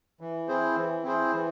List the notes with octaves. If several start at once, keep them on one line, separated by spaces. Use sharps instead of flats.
E3
C4 E4 G#4 C5
E3
C4 E4 G#4 C5
E3